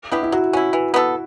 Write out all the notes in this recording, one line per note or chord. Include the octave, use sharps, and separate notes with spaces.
B3 D4 E4 G4
E4
F#3 F#4
C#4 E4 F#4
E3
B3 F#4 A4